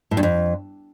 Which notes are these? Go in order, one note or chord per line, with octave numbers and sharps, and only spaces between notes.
A2
G2
F2